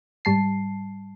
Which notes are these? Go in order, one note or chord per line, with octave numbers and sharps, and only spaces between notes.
G#2 G3 A5 C7